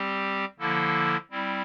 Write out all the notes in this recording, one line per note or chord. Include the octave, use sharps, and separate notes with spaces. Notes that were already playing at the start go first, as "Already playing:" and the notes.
Already playing: G3 C4 G4
D3 F3 A#3 E4 A4
G3 C4 E4